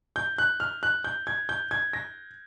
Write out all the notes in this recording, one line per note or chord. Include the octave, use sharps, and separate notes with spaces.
G6
F#6
F6
F#6
G6
G#6
G6
G#6
A#6